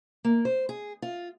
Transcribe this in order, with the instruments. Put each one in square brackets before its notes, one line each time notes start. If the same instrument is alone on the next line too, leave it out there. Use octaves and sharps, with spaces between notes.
[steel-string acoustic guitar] A#3
C5
G#4
F4